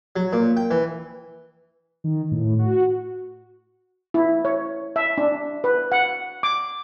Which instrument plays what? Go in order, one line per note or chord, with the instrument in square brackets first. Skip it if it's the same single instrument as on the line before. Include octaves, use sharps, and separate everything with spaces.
[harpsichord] F#3
A#2
G5
E3
[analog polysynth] D#3
A2
F#4
[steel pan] E4
C#5
E5
D4
B4
F#5
D6